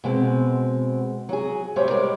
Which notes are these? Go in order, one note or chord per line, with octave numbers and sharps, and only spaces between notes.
B2 G#3 C4
F#3 G#4
A2 F#3 G3 C5 C#5 E5
G3 G#3 A#4 C#5 D5